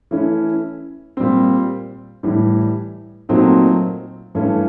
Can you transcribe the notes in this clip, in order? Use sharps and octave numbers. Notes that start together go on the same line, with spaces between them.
E3 A3 C#4 E4
A#2 G3 C4
A2 E3 G3
A#2 F#3 A3 C4 D#4
G2 E3 A3 C#4